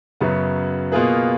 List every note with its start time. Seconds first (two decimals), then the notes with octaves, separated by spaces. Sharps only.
0.21 F#2 C#3 F#3 B3
0.92 B2 A#3 F4 G#4 B4